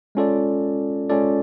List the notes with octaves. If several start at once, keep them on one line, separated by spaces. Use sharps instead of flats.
G#3 C#4 F4 A4 D5
G#3 C#4 F4 A4 D5